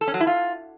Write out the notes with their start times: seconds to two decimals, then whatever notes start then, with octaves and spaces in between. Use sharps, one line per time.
0.01 A4
0.08 C#4
0.14 F#3
0.20 E4
0.27 F4